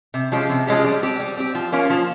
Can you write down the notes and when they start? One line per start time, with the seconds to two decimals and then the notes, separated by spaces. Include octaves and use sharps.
0.14 C3
0.32 F3 G#3 C#4 G4
0.49 C3
0.67 F3 G#3 C#4 G4
0.84 G3
1.02 C4 G4
1.20 G3
1.37 C4 G4
1.55 F3
1.72 A#3 C#4 F4
1.90 F3